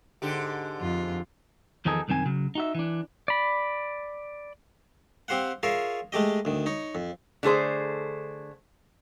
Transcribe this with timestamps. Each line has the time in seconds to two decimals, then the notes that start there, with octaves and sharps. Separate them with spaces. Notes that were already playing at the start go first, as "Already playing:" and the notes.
0.22 G#2 D3 G4
0.80 F2 F4
1.85 E2 D#3 F3 D#4 G#4 A4
2.08 C2 F#2 D#3 C4 G#5
2.26 C#3 F#3
2.55 D#4 F#4 E5
2.75 E3 D4
3.28 D5 B5
5.28 C4 G4 C5 F5 F#5
5.63 F4 G#4 A#4 C#5 E5 F5
6.12 G#3 A3 G4 D#5
6.45 D2 D#3
6.66 D#4 C#5
6.95 F2
7.43 D3 A3 G#4 C5